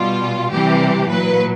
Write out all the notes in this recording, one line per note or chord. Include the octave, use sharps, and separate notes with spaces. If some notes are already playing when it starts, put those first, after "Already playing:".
Already playing: B2 G3 F4
C3 E3 G3 G4
A#2 F#3 B4